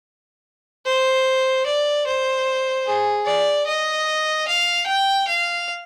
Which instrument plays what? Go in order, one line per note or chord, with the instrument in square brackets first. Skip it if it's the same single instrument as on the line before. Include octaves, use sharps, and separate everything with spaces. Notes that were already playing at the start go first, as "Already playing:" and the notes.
[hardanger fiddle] C5
D5
C5
G#4
D5
D#5
F5
G5
F5